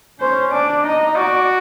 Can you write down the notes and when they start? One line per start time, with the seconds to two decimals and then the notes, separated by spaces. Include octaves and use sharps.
0.20 C#4 C5
0.52 D4 D5
0.84 D#4 D#5
1.16 F#4 D5